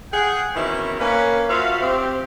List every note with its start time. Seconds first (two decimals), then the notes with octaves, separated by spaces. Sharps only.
0.12 G#4 F#5 G5
0.55 B2 D#3 E3 C4 C#4 E4
1.00 A#3 C#4 B4
1.49 F4 F#4 C5 E5 F5
1.82 C4 G4